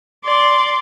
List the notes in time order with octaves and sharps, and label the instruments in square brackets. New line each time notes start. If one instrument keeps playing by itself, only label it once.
[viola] D5 C6